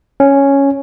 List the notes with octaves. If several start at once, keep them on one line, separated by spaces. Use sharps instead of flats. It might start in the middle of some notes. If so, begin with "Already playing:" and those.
C#4